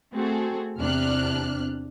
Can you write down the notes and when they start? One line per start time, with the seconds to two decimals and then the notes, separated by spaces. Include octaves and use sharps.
0.14 A3 C4 F#4 G#4 A4
0.79 E2 C3 D4 F6 F#6